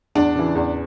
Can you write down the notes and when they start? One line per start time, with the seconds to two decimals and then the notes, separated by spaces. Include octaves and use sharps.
0.15 E2 D4
0.35 C#3 E3
0.55 E2